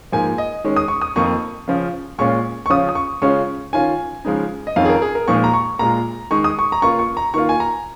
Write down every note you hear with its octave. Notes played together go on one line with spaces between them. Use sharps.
G#2 F3 A#3 G#5
D#5
D#3 G#3 C#4
D#6
C#6
D#6
F2 D#3 A#3 D#4 C#6
C#3 F3 C#4
A#2 G#3 C#4 F4 C#6
C#6
C#3 F3 C#4 F4 D#6
D#6
C#6
C#3 G#3 C#4 F4 C#6
D#3 C#4 F4 G#5
C#3 F3 G#3 D#4
D#5
F2 D#3 C#4 F4 F5
G#4
A#4
G#4
A#4
A#2 F3 G#3 D#4 C#6
A#5
C#6
A#2 G#3 F4 A#5
D#3 G#3 D#4 C#6
D#6
C#6
A#5
C#3 A#3 F4 C#6
C#6
A#5
D#3 A#3 F4 C#6
G#5
A#5